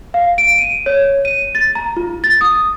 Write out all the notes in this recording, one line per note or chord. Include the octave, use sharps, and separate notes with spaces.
F5
D7
D#7
C#5
D#7
A6
A#5
F4
A6
D#6